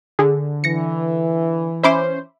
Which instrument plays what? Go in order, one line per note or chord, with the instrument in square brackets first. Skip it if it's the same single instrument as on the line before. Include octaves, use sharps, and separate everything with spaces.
[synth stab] D3 [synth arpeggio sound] G#4
[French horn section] E3 [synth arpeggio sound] A#6 C#7
[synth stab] C#4 C5 [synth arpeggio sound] E5 B5 D6